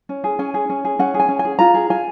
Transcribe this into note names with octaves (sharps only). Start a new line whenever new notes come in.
C#4
G#4
C#4 G#5
G#4
C#4
G#4
C#4 F#5
G#4
G#5
C#4
G#5
G#4
F4 A#5
G#4
F4 G#5